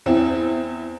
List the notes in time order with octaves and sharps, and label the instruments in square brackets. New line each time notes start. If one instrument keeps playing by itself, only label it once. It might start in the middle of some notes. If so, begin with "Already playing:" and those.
[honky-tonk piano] E2 C4 E4